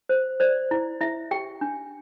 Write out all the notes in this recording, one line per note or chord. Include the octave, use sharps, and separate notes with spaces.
C5
C5 D5
E4
E4 E5
G4 G5
D4